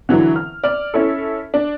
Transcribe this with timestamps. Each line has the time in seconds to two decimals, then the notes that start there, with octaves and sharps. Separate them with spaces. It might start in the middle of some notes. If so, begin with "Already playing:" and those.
0.09 D3 E3 F#3
0.36 F6
0.64 D5 F6
0.94 C#4 E4 A4
1.54 D4